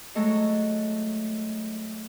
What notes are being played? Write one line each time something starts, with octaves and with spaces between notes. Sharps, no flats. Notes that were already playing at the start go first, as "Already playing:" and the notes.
F#3 G#3 A3 A4 D#5